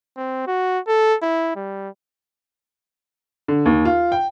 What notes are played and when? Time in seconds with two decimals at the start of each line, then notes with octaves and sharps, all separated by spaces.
0.17 C4
0.47 F#4
0.88 A4
1.22 E4
1.56 G3
3.48 D3
3.66 D#2
3.85 F4
4.12 G5